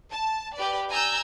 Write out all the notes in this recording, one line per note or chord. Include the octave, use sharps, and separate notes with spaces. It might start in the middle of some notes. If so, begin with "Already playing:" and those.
A5
G4 B4 D5
G#5 A#5 E6 G6